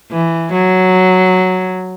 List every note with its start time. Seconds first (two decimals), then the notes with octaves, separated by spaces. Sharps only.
0.11 E3
0.52 F#3